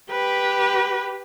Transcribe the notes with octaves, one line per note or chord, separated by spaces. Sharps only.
G4 B4